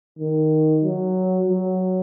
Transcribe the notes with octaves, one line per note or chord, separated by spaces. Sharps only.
D#3
F#3
F#3